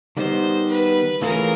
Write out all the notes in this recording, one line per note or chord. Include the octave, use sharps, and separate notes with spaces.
D#3 G3 B3 D#4 C5
B4
E3 A3 C#4 F4 G#4 A#4